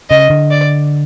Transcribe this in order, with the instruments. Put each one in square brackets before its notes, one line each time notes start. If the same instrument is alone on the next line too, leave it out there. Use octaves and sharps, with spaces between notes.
[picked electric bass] C#3 [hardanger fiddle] D#5
[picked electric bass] D3
[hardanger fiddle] D5